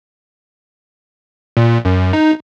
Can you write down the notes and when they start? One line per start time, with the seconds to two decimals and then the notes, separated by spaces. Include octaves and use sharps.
1.57 A#2
1.85 F#2
2.13 D#4